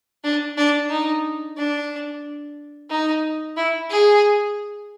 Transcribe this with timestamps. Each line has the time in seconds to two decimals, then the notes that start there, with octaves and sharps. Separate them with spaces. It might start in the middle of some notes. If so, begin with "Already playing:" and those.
0.24 D4
0.57 D4
0.90 D#4
1.58 D4
2.91 D#4
3.57 E4
3.90 G#4